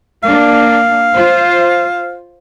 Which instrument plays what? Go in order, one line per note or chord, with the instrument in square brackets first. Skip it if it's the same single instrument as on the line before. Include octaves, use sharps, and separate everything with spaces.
[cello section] A#3 D4 [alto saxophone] F5
[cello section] F4 C5